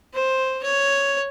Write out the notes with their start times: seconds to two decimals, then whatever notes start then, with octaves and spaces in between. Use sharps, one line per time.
0.13 C5
0.63 C#5